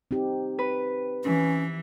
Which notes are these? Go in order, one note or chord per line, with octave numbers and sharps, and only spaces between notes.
C4 D#4 G4
B4
E3 C#4